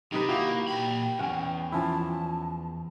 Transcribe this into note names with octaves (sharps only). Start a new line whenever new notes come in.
C3 D#3 D#4 G4 B4
A#3 E4 F#4 G4 F5
A#2 G5 B5
B1 E2 C#4 F#5
F3 C#4 E4 A5